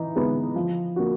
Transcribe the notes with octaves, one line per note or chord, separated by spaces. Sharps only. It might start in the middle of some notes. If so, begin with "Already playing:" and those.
Already playing: E3 D#4
G#3 B3 D#4
F3
A#3 D4 F#4